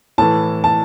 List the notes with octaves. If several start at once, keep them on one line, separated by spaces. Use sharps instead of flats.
A2 E3 A5
A5